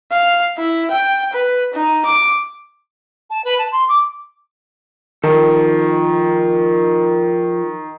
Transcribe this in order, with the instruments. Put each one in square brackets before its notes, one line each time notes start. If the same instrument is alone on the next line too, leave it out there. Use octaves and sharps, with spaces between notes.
[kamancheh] F5
E4
G5
B4
D#4
D6
[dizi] A5
B4
A5
C6
D6
[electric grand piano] D#3 [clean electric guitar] F3 D#4 A4